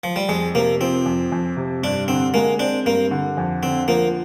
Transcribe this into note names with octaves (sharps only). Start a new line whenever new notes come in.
F3
G3
F2 G#3
C3 A#3
F3 C4
F2
F2
C3
G2 D4
D3 C4
G#3 A#3
C4 D4
G2 A#3
D3
F2
D3 C4
F3 A#3